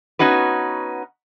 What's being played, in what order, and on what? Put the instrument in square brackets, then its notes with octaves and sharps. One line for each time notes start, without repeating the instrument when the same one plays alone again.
[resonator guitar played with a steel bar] B3 C#4 D#4 F#4 B4